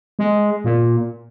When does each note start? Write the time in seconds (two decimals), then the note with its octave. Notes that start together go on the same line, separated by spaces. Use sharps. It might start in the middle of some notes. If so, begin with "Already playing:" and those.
0.19 G#3
0.64 A#2